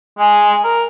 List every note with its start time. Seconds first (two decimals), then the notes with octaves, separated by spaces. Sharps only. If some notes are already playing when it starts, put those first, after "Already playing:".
0.18 G#3 G#5
0.64 A#4